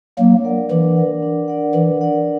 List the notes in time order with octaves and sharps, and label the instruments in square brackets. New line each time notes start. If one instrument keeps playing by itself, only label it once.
[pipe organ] F#3 A#3 [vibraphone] D4
[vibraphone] A#4 D5 F#5
[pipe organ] E3 [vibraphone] D4
[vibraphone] A#4 D5 F#5
D4
A#4 D5 F#5
[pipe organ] E3 [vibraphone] D4
[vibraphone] A#4 D5 F#5